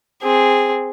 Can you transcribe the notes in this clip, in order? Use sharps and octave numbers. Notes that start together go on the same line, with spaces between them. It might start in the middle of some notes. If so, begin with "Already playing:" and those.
C4 G#4